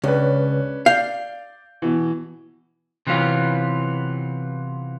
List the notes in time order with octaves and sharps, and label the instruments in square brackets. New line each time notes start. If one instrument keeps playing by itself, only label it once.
[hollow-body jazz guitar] C#2 [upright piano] C#4 D4 B4
[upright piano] D5 G6 [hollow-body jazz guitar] F5
[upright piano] B2 E3
[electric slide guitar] C3 E3 F#3 B3 F4